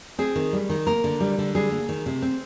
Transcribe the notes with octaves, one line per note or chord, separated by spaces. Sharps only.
C4 G#4
D#3
G3
D#3
A#3 A#4
D3
G3
D3
G3 G#4
A#3
D#3
C3
C4